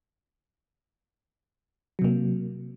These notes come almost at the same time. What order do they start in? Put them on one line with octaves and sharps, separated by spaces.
F#3 C3 A#3